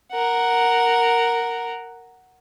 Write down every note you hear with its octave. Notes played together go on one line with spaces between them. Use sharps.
A#4 F#5